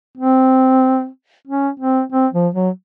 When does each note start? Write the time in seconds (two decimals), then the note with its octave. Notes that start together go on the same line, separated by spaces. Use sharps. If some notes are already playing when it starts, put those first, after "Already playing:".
0.17 C4
1.47 C#4
1.79 C4
2.12 C4
2.33 F3
2.54 F#3